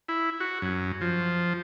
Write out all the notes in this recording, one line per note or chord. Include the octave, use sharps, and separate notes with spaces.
E4
F#4
F#2
F3